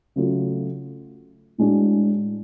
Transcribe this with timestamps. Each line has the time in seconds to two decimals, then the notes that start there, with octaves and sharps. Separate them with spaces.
0.16 C#3 F#3 A3 F4
1.58 A2 G#3 D4 F#4